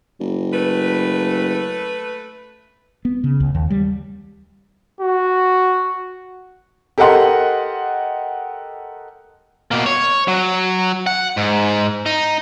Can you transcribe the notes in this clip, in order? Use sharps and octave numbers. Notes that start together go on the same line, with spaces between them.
F#1
A3 B4
B3
C#3
C#2
D#2
G3
F#4
G4 A4 A#4 D#5 F#5 C6
B2 A#3
C#5
F#3
F#5
G#2
D#4